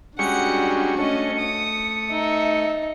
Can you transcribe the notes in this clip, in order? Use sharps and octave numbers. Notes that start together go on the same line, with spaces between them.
G3 G#3 C#4 D4 F#4 F#5 C#7
A3 C#4 D#5
D#6
D#4 E5